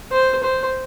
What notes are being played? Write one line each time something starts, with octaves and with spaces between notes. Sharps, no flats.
C5
C5